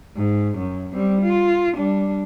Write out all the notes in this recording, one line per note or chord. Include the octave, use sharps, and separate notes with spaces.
G#2
F#2
G3 C4
F4
G3 D4